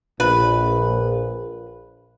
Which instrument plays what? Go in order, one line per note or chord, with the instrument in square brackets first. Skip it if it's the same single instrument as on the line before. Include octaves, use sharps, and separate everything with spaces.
[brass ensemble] A#1 [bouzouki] B4